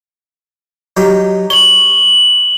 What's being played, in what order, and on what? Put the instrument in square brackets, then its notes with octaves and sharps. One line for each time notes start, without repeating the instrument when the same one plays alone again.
[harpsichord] F#3 D#4 G4
[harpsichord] C#5 [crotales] F#7 G7